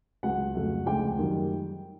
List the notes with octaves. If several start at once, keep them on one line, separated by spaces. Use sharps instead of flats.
C#2 C#3 F#3 F#5
F2 C#3 F#3 A3
D2 C#3 F3 G#3 G5
F#2 D#3 G3